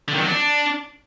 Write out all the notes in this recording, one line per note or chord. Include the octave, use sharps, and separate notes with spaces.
D3
D#3
F#3
D4